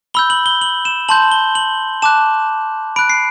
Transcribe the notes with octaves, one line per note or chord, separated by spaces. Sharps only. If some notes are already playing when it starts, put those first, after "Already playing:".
B5 E6 G6 G7
F#7
G7
F#7
E7
A5 C6 G6 F#7
G7
F#7
A5 D6 F#6 E7
B5 F#6 D7
C7